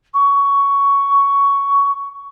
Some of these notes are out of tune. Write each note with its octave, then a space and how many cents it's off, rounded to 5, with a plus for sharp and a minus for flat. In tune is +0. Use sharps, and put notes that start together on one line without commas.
C#6 +10